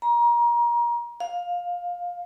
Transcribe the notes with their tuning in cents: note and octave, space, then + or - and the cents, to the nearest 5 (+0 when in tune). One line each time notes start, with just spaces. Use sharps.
A#5 +30
F5 +15